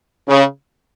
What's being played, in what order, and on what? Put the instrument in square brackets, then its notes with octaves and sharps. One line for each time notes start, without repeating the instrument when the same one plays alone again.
[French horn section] C#3